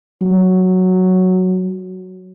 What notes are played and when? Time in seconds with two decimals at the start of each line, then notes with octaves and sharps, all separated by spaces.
0.21 F#3